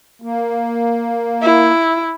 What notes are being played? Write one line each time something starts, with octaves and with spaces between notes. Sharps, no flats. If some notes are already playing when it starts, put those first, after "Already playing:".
A#3
E4